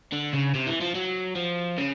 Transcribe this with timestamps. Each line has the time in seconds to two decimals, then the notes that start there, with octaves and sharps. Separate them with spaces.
0.12 D3
0.33 C#3
0.55 C3
0.67 E3
0.81 F3
0.95 F#3
1.36 F3
1.78 C#3